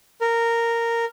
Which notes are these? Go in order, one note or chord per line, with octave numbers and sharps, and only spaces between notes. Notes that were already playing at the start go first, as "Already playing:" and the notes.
A#4